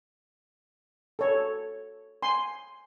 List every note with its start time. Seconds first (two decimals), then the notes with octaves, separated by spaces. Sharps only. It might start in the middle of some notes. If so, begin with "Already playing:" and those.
1.19 A4 C#5
2.23 G#5 C6